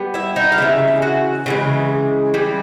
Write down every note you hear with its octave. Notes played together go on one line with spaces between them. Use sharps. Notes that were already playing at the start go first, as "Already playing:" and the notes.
Already playing: G3 B3
E4 E5
D#4 D#5
F5
C#3 E3 G#3 E4 E5
F#4 F#5
C#3 E3 G#3
E3 G3